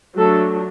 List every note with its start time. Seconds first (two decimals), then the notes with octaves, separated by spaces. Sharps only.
0.18 F#3 A3 D4 A4